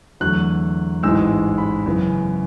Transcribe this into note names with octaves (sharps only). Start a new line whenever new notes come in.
E2 D3 F#3 A3 F#6
A1 G#2 E3 G#3 E6
B5
F#2 C#3 E3 B3